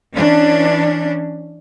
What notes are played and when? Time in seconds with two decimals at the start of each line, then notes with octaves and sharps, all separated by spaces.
0.15 E3 C#4 D4